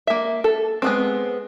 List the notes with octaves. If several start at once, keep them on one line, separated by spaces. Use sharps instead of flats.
A#3 E5
A4
G#3 B3 C4